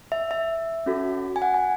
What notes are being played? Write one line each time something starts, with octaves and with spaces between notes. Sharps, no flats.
E5
E5
C#4 F#4 A4
G#5
F#5
G#5